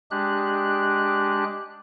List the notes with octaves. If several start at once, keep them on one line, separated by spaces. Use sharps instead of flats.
G#3 D4 G4 F#6